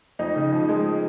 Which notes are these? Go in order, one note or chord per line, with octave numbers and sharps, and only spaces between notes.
F2 D#4
C#3
F3
G#3